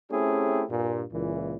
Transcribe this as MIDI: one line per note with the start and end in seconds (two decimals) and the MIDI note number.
0.11 0.64 57
0.11 0.64 60
0.11 0.64 61
0.11 0.64 64
0.11 0.64 67
0.11 0.64 68
0.70 1.04 43
0.70 1.04 46
1.13 1.57 37
1.13 1.57 46
1.13 1.57 52